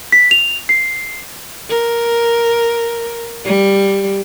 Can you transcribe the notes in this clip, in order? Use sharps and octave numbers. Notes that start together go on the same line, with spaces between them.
B6
F7
C7
A#4
G3